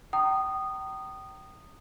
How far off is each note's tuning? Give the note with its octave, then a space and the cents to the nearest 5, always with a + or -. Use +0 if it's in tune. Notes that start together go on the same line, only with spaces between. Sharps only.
G5 -30 A#5 -20 D#6 -15